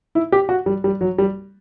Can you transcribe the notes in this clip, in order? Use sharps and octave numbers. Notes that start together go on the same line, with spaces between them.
E4
G4
F#4
G3
G3
F#3
G3